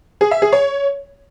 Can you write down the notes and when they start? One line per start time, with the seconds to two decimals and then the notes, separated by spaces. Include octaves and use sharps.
0.21 G#4
0.31 E5
0.42 G#4
0.53 C#5